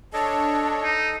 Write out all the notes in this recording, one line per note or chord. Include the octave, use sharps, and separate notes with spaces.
D4 A4 C#5 D#5 A5
D#4